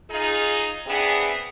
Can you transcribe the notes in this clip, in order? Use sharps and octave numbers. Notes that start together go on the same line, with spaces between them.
D#4 F4 G#4
E3 B3 C4 D4 G#4